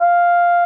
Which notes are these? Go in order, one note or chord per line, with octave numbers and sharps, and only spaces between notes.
F5